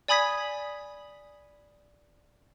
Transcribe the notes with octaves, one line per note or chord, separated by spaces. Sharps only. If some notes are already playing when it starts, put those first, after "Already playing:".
D5 G#5 B5 D#6 G#6 B6